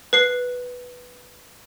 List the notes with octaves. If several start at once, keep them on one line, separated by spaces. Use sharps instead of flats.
B4 C7